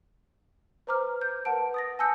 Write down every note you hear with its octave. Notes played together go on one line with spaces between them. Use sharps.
B4 C5 A#5 D6 F6
G6
A#4 B4 F#5 A5 D7
D#6 A6 A#6
G#5 A5 D#6 E6 G6 C#7